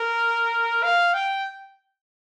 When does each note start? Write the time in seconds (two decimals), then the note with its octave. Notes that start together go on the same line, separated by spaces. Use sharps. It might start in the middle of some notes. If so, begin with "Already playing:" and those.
Already playing: A#4
0.83 F5
1.14 G5